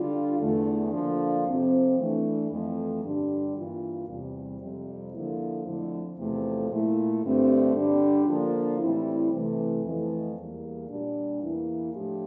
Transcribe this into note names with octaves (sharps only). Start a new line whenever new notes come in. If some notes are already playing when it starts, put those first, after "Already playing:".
Already playing: D3 G3 D4 F4
E2 D3 A3
D3 F3 A#3 D4 F4
F2 C3 F3 C4
E3 A3 D4
F2 E3 A3
G2 D3 G3 D4 G4
G2 E3 A#3 F4
E2 C3 G3
F2 C3 G3
D3 F3 A#3 E4
F2 D3 F3 A3 E4
E2 C3 F3 A3
A#2 A3 E4
G2 D3 A3 C4 G4
G2 D3 G3 D4 G4
D3 F3 A#3 D4 F4
A2 E3 G3 C4 E4
C3 E3 A3
F2 E3 A3
E2 E3 G3 A#3
A#2 G3 D4
E2 E3 A#3 E4
A2 F3 A3 D4 G4